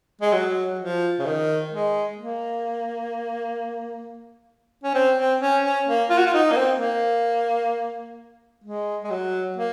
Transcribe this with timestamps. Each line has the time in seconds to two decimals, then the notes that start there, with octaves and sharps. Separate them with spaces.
0.21 G#3
0.33 F#3
0.79 F3
1.19 C#3
1.26 D#3
1.71 G#3
2.17 A#3
4.83 C#4
4.95 C4
5.18 C4
5.41 C#4
5.64 C#4
5.87 A#3
6.10 F4
6.18 F#4
6.26 F4
6.34 D#4
6.52 A#3
6.57 C4
6.79 A#3
8.64 G#3
9.04 G#3
9.11 F#3
9.57 A#3